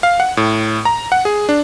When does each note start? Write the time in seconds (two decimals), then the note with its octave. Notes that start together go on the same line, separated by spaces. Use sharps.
0.03 F5
0.20 F#5
0.37 A2
0.85 A#5
1.12 F#5
1.25 G#4
1.49 D4